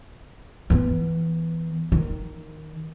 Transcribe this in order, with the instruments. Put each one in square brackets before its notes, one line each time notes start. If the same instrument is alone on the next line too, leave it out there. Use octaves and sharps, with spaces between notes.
[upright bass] E3 B3
D#3